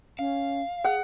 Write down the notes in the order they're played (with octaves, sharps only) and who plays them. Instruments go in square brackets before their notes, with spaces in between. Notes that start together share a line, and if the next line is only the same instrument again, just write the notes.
[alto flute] C#4 [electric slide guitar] F5
[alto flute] G#4 [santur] F#5